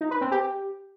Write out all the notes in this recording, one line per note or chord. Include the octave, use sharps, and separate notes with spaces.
D#4
B4
C4
G4